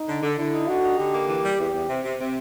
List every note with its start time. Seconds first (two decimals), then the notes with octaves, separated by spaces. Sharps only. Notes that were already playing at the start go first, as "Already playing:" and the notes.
Already playing: D#4
0.08 D3
0.23 D3
0.38 D3 E4
0.53 D#4
0.68 D3 F#4
0.84 D#4
0.98 D3 G4
1.14 A#3
1.29 E3
1.44 G3
1.59 E2
1.74 E2
1.89 C3
2.04 C3
2.19 C3